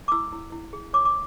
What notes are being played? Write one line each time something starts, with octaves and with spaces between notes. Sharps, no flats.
D6
E4 E6
E4
E4
G#4
C#5 D6
D6